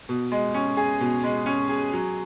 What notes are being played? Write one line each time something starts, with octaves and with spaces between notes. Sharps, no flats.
B2
G#3
C#4
G#4
B2
G#3
C#4
G#4
F#3